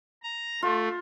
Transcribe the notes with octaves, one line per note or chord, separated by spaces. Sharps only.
A#5
A3 F4